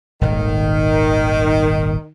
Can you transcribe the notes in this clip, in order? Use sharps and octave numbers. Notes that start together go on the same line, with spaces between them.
D#1 G#1 D#3